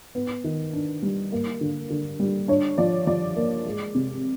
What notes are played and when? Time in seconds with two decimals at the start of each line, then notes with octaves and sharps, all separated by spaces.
0.15 B3
0.44 D#3
0.73 D4
1.03 G3
1.32 A#3
1.61 D3
1.90 D3
2.20 G3
2.48 D4 C#5
2.78 F3 D5
3.07 F3 D5
3.36 A#3
3.66 G#3
3.95 C3